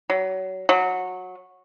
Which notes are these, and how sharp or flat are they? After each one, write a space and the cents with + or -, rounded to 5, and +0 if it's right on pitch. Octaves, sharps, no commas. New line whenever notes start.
F#3 +25
F#3 -15